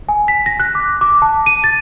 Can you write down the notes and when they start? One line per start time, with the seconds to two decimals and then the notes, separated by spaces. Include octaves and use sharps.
0.09 G#5
0.28 B6
0.46 A#6
0.60 F#6
0.75 D6
1.01 D6
1.22 A5
1.46 D#7
1.64 A6